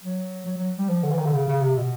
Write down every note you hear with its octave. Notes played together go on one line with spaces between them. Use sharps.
F#3
F#3
F#3
G3
F3
D3
E3
D#3
D3
C#3
C#3
C3
B2